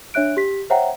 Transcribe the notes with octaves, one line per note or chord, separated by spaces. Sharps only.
D4 C#5 E5 F#6 D7
G4 B6
C5 C#5 E5 F#5 G5 A#5